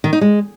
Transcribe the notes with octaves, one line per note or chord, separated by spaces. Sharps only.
D#3
D#4
G#3